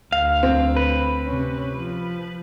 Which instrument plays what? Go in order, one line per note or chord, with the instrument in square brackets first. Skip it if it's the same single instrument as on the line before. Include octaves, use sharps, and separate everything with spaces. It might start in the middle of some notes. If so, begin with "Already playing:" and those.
[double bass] D2 [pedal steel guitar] F5
[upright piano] C4
[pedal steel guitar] B4
[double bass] C3 C#4
F3